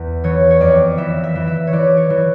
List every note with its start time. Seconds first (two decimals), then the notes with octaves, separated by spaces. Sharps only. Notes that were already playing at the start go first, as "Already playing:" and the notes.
Already playing: E2
0.24 E3 C#5
0.51 C#5
0.60 F2 D5
0.98 E3 E5
1.24 E5
1.35 E3
1.47 E5
1.67 C#5
1.73 E3 D5
1.97 C#5
2.10 E3